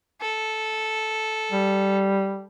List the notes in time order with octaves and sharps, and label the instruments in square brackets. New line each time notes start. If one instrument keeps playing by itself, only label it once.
[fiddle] A4
[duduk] G3